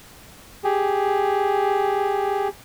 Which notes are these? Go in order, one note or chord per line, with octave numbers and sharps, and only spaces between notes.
G4 G#4